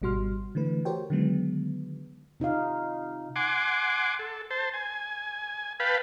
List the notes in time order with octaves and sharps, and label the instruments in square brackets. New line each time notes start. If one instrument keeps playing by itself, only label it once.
[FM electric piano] G#1 B2 G3 F#4 C6 F6
D3 E3 A3 B4
F#4 G4 A#4 C5 C#5 G5
D3 D#3 F#3 G#3 B3
[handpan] C3 D#4 F4 F5
[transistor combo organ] F#5 G#5 C6 D6
A4
C5 A5
G#5
B4 F5 G5 A5 B5